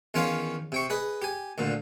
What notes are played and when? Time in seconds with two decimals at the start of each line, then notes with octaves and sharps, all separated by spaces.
0.14 E2 D#3 C#4 F4 C#5 F5
0.72 C3 G5 C#6
0.90 G#4 B4 D#5
1.22 G4 G#5
1.58 D2 A#2 D3